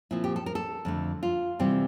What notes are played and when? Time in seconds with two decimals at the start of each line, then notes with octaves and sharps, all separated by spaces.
0.11 A#2 F3 C4 E4
0.24 G4
0.36 A4
0.46 A#4
0.55 A4
0.85 F2 D3 A3
1.23 F4
1.59 C3 E3 G3 C4